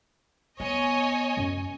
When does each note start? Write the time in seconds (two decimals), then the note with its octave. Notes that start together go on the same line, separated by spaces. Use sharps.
0.60 B3 C#5 D#5 G#5
1.37 F#2